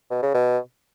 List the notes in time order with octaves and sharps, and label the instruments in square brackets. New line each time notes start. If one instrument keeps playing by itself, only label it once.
[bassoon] B2
C#3
B2